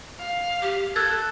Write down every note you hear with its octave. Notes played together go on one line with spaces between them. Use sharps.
F5
G4
A4 E6 F#6 G#6 A6